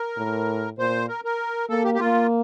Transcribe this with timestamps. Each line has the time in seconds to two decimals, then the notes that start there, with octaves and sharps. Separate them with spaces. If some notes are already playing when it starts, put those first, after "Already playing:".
Already playing: A#4
0.17 A2
0.79 A#2 C5
1.09 A#4
1.25 A#4
1.69 A#3 A4
1.84 G4
1.94 G4
2.00 A#3 F4